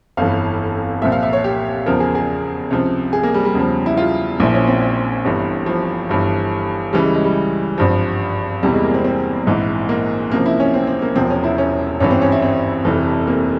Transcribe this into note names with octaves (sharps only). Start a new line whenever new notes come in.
G1 F2 E3 F5
C2 A#2 F3 E5
F5
E5
C#5
G4
E2 C#3 F3 A#4
G#4
G#4
C#2 C3 F3
G#4
A#3
G3
G3
E2 C#3 F3
E4
F4
A#1 A#2 F3 E4
C#4
C4
G1 G2 E3
F3
G1 G2 E3
C#2 C#3 E3 G3
G#3
G#3
G3
G#1 G2 F3
E2 C3 E3 G3
G#3
A#3
C4
C4
A#1 G#2 E3
A#3
C#2 C3 F3 A#3
E4
C#4
C4
C4
A#3
E1 E2 C3 F3 C4
C#4
E4
C#4
G#1 G2 E3 C#4
C4
C#4
E4
C4
F1 F2 C3 E3
A#3